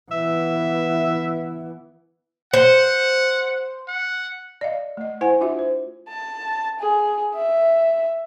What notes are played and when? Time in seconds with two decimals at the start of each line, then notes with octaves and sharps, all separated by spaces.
0.11 E3 B3 E5
2.53 C5 F#5
3.88 F#5
4.61 D5 D#5 F5
4.97 A3 D#5
5.21 E4 C5 F#5 G#5
5.41 D4 F4 F#4 E5
5.59 C5
6.09 A5
6.80 G#4
7.35 E5